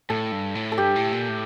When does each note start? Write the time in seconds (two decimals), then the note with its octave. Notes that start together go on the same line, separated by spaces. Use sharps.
0.10 A2 A4
0.32 G2
0.55 A2
0.72 A4
0.78 G2 G4
0.96 A2
1.13 A#2
1.29 A2